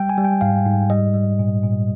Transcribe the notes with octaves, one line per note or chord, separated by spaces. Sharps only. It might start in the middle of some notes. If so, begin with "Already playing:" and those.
Already playing: G3 G5
G#5
G3
G5
G#2 F5
G#2
G3 D#5
G3
A#2
A#2